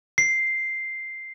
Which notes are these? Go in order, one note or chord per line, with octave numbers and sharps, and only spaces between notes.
C7